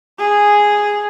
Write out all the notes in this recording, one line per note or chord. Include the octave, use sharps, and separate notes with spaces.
G#4